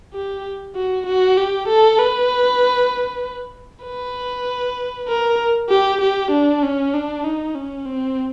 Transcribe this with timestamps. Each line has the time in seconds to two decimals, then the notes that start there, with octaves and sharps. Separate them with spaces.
0.14 G4
0.75 F#4
1.06 F#4
1.37 G4
1.68 A4
1.99 B4
3.85 B4
5.08 A#4
5.70 G4
6.01 G4
6.31 D4
6.63 C#4
6.94 D4
7.24 D#4
7.56 C#4
7.86 C4